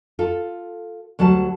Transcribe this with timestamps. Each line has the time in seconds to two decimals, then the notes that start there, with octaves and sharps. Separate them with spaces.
0.19 F4 A4
1.19 D2 F#3 G3 A5